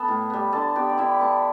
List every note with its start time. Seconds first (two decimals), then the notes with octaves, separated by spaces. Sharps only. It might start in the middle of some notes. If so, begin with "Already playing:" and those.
Already playing: B3 A4 A5 B5
0.08 A2
0.30 G3 B3
0.53 D3 A4 A5
0.75 B3 G4 G5
0.89 D5
0.98 D3 E4 E5
1.20 B3 A4 A5